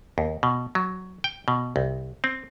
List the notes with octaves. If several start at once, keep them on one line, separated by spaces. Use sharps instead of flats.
D#2
B2
F#3
G5
B2
C2
C4